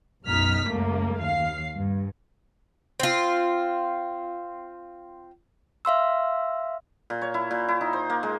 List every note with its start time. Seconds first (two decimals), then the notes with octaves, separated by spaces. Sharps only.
0.25 B1 F#2 D#4 F6 B6
0.66 C#2 F#2 A3 A#3
1.19 D#2 F5 C7
1.74 G2
3.00 C4 F4
5.85 E5 F5 C6 E6
7.10 A#2
7.21 C#5
7.34 E4
7.51 A#2
7.68 E4
7.81 D#4
7.93 C5
8.10 A#3
8.23 G#3